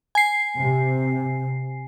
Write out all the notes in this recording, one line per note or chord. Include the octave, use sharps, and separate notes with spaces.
G#5 C7
C3